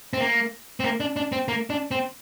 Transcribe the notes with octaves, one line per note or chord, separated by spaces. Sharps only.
C4
A#3
C4
A#3
D4
D4
C4
A#3
D4
C4